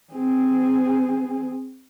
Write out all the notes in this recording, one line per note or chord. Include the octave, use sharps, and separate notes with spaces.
C4 G#4